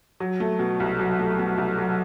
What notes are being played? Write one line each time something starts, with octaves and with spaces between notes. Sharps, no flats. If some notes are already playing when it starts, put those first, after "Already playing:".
F#3
A3
B2
C2
F#3
A3
B2
C2
F#3